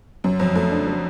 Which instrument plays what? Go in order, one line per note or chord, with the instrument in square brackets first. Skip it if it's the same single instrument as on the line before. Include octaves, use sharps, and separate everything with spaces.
[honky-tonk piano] F#2 [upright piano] F#3
[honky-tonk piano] F2 [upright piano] F#3
[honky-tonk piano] F2 [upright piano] A3
[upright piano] D4
F#3